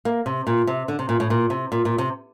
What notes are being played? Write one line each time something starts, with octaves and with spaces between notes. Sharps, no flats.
A#3
C3
A#2
C3
D3
C3
A#2
A2
A#2
C3
A#2
A#2
C3